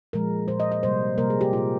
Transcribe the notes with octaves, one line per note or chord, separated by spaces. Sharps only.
A#2 F3 G#3 A#4
A#2 F3 G#3 C5
D#5
D#5
C3 G3 A#3 C5
C3 G3 A#3 A#4
G#4
G4
A#2 G3 A#3 F4